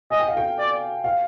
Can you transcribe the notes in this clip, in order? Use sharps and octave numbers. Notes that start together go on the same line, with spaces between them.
D#5 G#5
G5
F5
G5
D5
F5